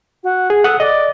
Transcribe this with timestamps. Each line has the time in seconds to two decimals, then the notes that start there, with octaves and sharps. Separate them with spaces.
0.24 F#4
0.50 G#4
0.64 A4 F#5 D#6
0.80 D5 D#5